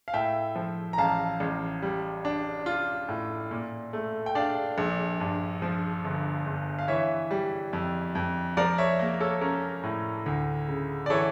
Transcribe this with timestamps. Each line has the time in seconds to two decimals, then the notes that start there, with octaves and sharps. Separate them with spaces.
0.08 F5
0.14 A2 E5 G5
0.56 F3
0.93 A#5
0.98 A1 F5 A5
1.40 A1
1.82 G3
2.25 D4
2.66 F4
3.09 A2
3.51 A#2
3.93 A3
4.26 G5
4.35 D4 D5 F5
4.78 A#1
5.20 G2
5.62 F3
6.05 G1
6.46 G1
6.79 F5
6.88 E3 C#5 E5
7.31 G3
7.73 F2
8.15 F2
8.57 F3 A#4 D5
8.78 C#5 E5
8.99 A#3
9.21 A4 C#5
9.41 C#4 A#4
9.83 A2
10.26 D2
10.68 C#3
11.06 D5
11.10 E3 A4 C#5